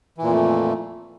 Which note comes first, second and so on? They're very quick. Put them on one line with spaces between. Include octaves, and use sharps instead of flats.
E3 A#2 F2 A3